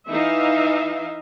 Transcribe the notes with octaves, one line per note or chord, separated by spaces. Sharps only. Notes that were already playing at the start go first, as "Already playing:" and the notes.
E3 D#4 E5 F5